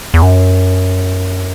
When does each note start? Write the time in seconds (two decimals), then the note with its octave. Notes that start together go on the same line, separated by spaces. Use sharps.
0.14 E2
0.22 F#2